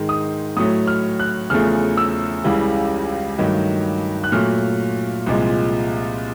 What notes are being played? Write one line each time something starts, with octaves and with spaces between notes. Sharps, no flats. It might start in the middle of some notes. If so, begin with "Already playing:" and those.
Already playing: G#2 D#3 G#3
D#6
A2 F#3 A3 D#6
F6
F#6
E2 C#3 F3 A3 F6
E6
C#2 C#3 E3 G3
G2 D#3 F#3 A3
F#6
A#2 F#3 A3 F6
C2 A#2 F3 G#3